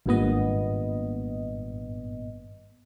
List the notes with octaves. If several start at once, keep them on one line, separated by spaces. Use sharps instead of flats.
G#1 G2 A#2 B3 D#5